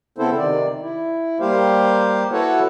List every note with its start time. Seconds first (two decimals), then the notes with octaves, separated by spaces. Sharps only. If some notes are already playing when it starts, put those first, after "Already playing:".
0.18 C#3 B3 C4 E4 A4 C5
0.37 C3 D#3 D5
0.82 E4
1.40 G3 A#3 G4 C5 F5
2.32 E4 F#4 A4 B4 C#5 F#5